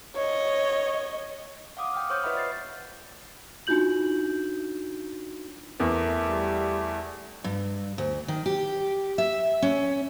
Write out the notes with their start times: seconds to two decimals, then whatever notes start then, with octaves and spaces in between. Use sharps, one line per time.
0.16 C#5 D#5
1.77 F5 F#5 D6 D#6
1.94 G5 F6
2.10 C5 C#5 C#6 D#6 F6 G6
2.23 F4 B4 D#5 E5 F#5 B5
2.35 D5 A6 C7
3.67 D4 D#4 F4 F#4 G6 F#7
5.80 E2 A3 A#4
6.29 G3
7.44 G2
7.98 D2
8.28 D#3
8.46 G4
9.18 E5
9.62 C#4